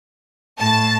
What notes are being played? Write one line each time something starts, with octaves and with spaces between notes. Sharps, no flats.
A2 A5